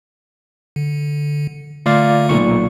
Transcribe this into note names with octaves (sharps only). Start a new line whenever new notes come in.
D3
D3 A3 F4 D5 F5
B1 A#2 C#6